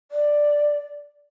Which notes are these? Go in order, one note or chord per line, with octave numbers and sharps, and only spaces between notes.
D5